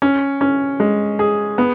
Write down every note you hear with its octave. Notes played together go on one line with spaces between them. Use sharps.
C#4
C#4
G#3
G#4
B3